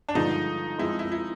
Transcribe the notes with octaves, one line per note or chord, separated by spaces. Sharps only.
D4
G2 D3 F3 G#3 D#4
F3 G#3 C4 E4
E4
E4